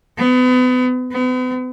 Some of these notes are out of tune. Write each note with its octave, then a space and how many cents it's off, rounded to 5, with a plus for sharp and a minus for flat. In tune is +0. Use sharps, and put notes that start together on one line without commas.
B3 +35
B3 +40